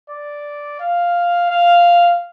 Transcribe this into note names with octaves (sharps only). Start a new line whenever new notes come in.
D5
F5
F5